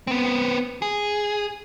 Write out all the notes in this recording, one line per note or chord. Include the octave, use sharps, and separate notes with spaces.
B3 C4
G#4